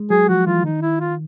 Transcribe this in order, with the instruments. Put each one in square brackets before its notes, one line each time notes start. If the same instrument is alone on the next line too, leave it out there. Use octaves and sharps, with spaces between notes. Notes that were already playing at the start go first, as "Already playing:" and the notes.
Already playing: [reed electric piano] G#3
[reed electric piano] F#3 [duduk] G#4
[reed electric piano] F3 [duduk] F#4
[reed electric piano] E3 [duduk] F4
[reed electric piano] D#3 [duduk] D#4
[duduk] E4
F4